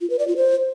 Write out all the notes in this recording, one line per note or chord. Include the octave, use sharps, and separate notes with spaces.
F4
B4
D5
F4
C5